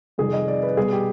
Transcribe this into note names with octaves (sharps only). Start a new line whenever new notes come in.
F2 C3 D#3 G3 G#4
D#5
D5
B4
B2 G3 G#4
G4